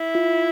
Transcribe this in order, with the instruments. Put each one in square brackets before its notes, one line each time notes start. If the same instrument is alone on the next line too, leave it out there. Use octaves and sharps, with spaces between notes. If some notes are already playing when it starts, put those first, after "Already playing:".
Already playing: [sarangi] E4
[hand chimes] F4